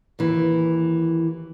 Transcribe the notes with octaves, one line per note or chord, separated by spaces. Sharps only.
D#2 E3